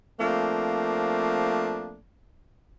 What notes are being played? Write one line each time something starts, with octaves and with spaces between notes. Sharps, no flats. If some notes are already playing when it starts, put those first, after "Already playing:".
F3 A3 A#3 C4 D4